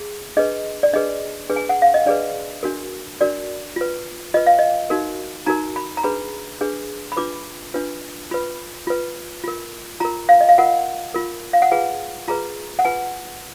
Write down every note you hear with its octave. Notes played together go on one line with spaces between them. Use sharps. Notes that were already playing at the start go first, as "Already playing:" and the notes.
Already playing: G#4
D4 G#4 B4 D#5
D5
D4 G#4 B4 D#5
D4 G#4 B4
G#5
F#5
F5
D#5
D4 G#4 B4 D5
D4 F#4 A#4
D4 F#4 A#4 D5
F4 B4
F4 B4 D#5
F5
D#5
D#4 F#4 A#4
D#4 F#4 A#4 A#5
B5
A#5
D4 G#4 B4 B5
D4 G#4 B4
B5
D4 F4 B4 D6
D4 F4 B4
F4 B4 B5
F4 B4
F4 A#4
F4 A#4 A#5
F5
D#5
F5
F4 A#4 F#5
F4 A#4
F5
F#5
F4 G#4 B4 G#5
F4 G#4 B4 A#5
F#5
F4 B4 G#5